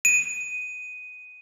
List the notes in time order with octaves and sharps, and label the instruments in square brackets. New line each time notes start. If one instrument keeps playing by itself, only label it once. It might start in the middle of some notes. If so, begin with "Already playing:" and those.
[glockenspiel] D#7